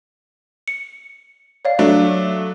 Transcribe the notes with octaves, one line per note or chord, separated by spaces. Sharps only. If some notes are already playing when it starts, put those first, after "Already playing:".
C#7
C#5 D5 F5
F#3 A3 D4